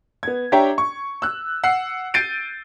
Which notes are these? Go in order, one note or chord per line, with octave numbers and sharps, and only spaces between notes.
B3 G#6
D4 G4 C#5 E5 G5 A#5
C#6
E6 F#6
F#5 E6 C7
G6 A6 C7 D7 D#7